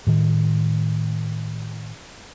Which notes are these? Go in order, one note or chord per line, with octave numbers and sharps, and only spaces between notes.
A2 D#3